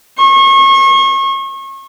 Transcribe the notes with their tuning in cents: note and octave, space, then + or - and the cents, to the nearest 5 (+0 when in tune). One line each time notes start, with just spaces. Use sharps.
C#6 -35